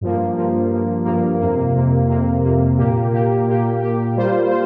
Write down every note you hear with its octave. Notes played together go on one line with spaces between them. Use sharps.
G2 F3 A#3
G2 F3 A#3
G2 F3 A#3
G2 F3 A#3
F2 C3 A#3
F2 C3 A#3
F2 C3 A#3
F2 C3 A#3
A#2 A#3 G4
A#2 A#3 G4
A#2 A#3 G4
A#2 A#3 G4
G3 A#3 F4 C5
F4 C5